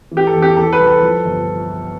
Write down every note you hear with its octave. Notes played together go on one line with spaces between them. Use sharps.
E3
G4
A4
E2
G4
E3 A4
B4
C2
A4
F3
G1